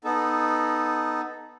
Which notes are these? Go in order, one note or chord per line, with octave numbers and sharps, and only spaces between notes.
B3 D#4 A4